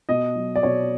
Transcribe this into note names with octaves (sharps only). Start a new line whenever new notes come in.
B2 D#5
F#3
D5
B2 C#5